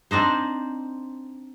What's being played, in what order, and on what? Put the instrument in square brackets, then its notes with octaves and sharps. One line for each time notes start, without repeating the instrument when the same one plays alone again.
[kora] C4 D4 D#4 C5